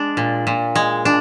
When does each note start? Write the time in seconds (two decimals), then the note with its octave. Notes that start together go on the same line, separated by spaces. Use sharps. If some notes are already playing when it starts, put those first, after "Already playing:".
Already playing: G#3 D4
0.17 A#2
0.47 A#2
0.75 G#3
1.05 D4